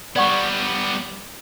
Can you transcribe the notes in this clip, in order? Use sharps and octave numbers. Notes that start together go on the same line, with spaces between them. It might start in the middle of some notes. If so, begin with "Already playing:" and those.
G3 B3 D5 F#5 C#6